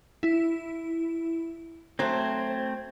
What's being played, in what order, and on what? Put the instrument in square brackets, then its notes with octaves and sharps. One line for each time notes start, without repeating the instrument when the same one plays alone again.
[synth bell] E4
[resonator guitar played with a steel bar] F#3 C5 [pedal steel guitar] A3 C4 [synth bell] G#6